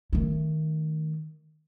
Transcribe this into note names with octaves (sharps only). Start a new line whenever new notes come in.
D#3 A3